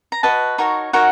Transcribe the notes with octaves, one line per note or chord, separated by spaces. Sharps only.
A#5
F#4 B4 D#5 A5
D#4 F#4 A#4 C#5
D#4 F#4 A#4 C#5 F#5